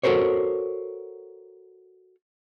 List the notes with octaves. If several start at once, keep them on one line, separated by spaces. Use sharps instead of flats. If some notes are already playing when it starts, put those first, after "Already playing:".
F#4 A4 A#4 C5 C#5